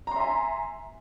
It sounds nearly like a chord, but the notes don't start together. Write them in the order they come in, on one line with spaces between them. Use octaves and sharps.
A#5 C6 E5 G#5